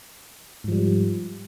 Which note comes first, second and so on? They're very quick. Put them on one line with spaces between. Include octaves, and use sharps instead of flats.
G#2 F3 G3